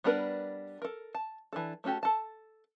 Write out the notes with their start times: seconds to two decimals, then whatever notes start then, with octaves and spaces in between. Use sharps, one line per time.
0.04 G3 B3 D4 A#4 B4
0.82 A4 A#4
1.15 A5
1.53 E3 D4 A4
1.84 A3 C#4 F#4 G4 A4
2.03 A4 A5